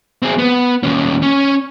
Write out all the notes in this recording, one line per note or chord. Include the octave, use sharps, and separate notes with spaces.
C4 G#4
B3
D#2 C#4
C#4